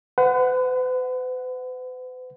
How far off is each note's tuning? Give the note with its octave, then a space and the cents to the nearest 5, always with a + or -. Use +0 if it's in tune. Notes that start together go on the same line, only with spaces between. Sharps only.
B4 +45 F#5 +0